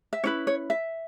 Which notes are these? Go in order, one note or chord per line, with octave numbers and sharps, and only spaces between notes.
E5
C#4 E4 B4 C#5
C#5
E5